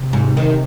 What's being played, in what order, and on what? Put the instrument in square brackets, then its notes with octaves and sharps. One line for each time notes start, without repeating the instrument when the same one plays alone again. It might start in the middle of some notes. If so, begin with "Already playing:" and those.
Already playing: [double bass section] C3
[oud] G#2
D#3